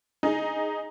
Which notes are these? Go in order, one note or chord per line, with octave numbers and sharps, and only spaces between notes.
D#4 G#4